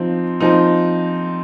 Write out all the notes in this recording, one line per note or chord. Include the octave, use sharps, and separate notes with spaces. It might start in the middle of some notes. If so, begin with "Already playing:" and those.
Already playing: F3 C4 D#4
F3 C4 D#4